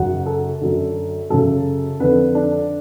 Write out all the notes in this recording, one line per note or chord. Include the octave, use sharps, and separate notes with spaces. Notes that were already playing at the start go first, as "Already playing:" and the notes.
Already playing: F#2 C#3 F#5
A4
F#2 D3
F#2 C#3 A4
F2 D3 B4
D4